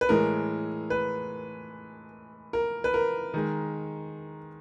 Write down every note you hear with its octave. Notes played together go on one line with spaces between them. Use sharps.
B4
A2 E3 G#3 A#4
B4
A#4
B4
A#4
D#3 G#3